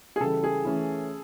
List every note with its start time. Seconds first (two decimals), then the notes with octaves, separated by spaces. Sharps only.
0.16 G#4
0.21 C#3 E3 G3 A4
0.44 G#4
0.65 E3 A3 C#4 E4